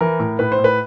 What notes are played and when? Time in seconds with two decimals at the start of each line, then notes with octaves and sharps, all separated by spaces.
0.01 E3 A#4
0.19 A2
0.39 A2 B4
0.52 C5
0.59 A2
0.64 B4